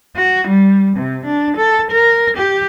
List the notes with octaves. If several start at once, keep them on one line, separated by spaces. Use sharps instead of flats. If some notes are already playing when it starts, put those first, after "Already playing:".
F#4
G3
C3
D4
A4
A#4
G4